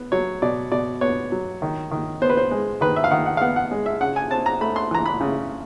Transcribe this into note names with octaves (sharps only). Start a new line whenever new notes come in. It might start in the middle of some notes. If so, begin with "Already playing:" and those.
Already playing: B3
F#3 C#5
B2 D5
B2 D5
B3 C#5
F#3
D#3
D#3
B3 C5
B4
C5
G#3
D#3 B4
E5
F5
D#3 F#5
F#5
F5
B3 F#5
F#5
G#3
E5
C#3 F#5
G#5
C4 A5
A#5
A3 B5
C6
E3 A#5
B5
C#3